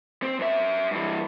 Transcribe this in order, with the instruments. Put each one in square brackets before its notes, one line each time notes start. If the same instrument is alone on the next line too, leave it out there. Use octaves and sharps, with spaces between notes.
[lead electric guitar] C4
F#2 E5
G2 E3